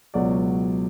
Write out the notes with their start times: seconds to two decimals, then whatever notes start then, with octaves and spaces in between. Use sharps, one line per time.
0.14 C#2 B2 F#3 D5